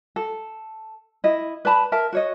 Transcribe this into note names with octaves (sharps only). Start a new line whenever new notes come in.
A4
E4 D#5
B4 D5 A5 B5
A#4 E5 A5
F#4 C#5 D#5